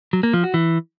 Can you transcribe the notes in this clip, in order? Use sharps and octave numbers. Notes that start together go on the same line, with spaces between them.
F#3
A#3
F3
F#4
E3